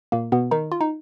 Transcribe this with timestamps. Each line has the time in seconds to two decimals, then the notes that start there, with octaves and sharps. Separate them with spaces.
0.12 A#2 A#3
0.32 B2 B3
0.51 D#3 D#4
0.72 F4
0.81 D#4